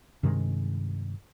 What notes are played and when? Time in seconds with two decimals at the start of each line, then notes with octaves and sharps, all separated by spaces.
0.23 G2 C3 D#3 G#3